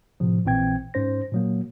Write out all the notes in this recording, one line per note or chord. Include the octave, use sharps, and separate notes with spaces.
A2 C3 F3
A#1 A#2 E3 C4 G5 G#6
G#2 C#4 C5 A#6
A#2 F#3 A#3